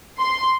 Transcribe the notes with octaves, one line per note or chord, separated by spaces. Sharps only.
C6